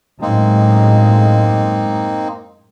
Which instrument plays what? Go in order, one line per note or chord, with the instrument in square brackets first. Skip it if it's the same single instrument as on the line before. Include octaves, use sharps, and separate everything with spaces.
[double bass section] F#2 A2 G#3 [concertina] A#3 C4 D#4